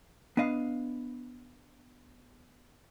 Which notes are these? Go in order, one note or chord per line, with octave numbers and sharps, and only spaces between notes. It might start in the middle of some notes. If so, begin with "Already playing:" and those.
B3 D4 D#5 F5